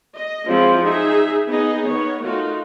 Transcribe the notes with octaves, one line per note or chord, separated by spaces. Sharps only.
D#5
F3 F#3 G#3 C4 E4 F4
D#4 G#4 E5
B3 D#4 G#4 D#5
D#3 B3 C#5
A3 D#4 F4 F#4